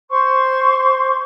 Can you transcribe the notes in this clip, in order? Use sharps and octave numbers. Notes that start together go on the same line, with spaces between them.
C5 C6 C#6